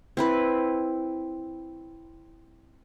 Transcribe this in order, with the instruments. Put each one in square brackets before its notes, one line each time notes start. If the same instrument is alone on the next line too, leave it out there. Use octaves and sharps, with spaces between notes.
[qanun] C4 E4 B4